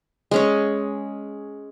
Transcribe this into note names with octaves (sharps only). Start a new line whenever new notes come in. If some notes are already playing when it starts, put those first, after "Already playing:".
G#3 C#4 C#5